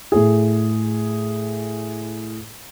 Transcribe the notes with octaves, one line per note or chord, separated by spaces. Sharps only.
A2 G#4